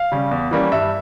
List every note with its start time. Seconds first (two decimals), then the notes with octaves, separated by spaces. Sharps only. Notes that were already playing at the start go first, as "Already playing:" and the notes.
Already playing: F5
0.12 C#3 G3 C#4
0.31 E2
0.51 E3 G3 A#3 C#4
0.72 G2 E5